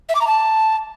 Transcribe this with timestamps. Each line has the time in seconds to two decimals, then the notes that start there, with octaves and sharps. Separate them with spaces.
0.09 E5
0.15 D6
0.21 A#5
0.27 A5